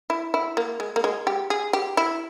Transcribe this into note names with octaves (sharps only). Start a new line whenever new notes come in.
E4
E4
A#3
G#3
A#3
G#3
G4
G#4
G4
E4